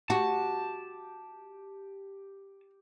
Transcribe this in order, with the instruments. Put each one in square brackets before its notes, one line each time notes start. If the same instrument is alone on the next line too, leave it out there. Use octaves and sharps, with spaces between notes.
[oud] F#4 [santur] G4 [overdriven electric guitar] A5